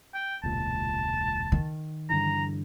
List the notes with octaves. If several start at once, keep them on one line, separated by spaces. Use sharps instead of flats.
G5
E1 C#2 A#2 A5
D#3
G2 D3 E3 A#5